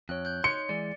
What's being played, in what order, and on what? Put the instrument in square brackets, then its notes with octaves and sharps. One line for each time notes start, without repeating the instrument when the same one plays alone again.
[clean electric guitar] F2 [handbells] C#5 F#6
[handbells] F#6 G6
[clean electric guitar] D#4 C#5 C6 [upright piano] C#7
[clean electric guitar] E3 G#3 [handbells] D5